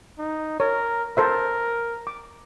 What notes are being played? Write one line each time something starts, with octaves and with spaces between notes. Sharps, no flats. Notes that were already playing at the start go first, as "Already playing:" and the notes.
D#4
A#4 C#5
A4 A#4 C5 E5
D6